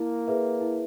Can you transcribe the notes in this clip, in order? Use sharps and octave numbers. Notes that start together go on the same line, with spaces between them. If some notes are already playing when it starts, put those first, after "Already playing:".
Already playing: A#3 E4
G#4 B4 E5
E4